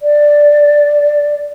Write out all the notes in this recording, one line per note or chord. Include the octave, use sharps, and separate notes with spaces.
D5